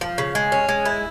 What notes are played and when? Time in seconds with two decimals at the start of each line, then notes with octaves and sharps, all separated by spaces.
0.01 F3
0.18 C#3
0.35 G#3
0.52 C#4
0.69 G#3
0.85 E4